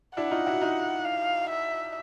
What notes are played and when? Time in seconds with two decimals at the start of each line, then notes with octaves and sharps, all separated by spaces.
0.17 D4 E4 F#5
0.31 D#4 F4
0.47 E4 F#4
0.61 D#4 F4
1.05 F5
1.49 E5